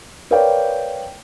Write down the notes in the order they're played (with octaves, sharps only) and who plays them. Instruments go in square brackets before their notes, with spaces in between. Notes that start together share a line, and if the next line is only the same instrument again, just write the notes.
[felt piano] A#4 B4 C#5 D5 F5 G5